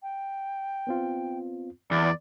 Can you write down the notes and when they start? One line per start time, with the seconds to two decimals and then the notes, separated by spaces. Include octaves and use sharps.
0.03 G5
0.87 B3 C4 F4
1.91 E2 D5